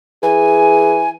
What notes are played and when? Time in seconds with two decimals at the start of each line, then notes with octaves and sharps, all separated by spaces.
0.23 E3 G#4 G#5